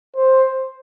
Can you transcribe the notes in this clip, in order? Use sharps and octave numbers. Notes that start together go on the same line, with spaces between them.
C5